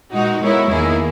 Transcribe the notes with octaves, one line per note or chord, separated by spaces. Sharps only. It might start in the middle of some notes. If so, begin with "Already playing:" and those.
A#2 G#3 D#4 F#4
G#3 B3 E4 A#4 C#5
E2 D#3 A#3 E4 G#4